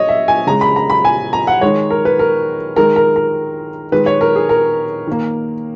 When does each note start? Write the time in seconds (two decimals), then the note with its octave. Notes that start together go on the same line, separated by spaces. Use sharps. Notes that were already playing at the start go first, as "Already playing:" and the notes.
Already playing: C#5 D#5
0.09 E5
0.28 G#5
0.47 C#3 G#3 A#5
0.61 B5
0.76 A#5
0.90 B5
1.05 G#5
1.33 A#5
1.47 F#5
1.61 D#3 G#3 C#5
1.91 A#4
2.05 B4
2.19 A#4
2.76 D#3 G#3 A#4
2.96 A#4
3.16 A#4
3.92 D#3 G#3 B4
4.06 C#5
4.21 A#4
4.36 G#4
4.49 A#4
5.07 D#3 A#3